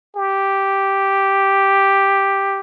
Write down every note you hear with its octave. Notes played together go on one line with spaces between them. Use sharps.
G4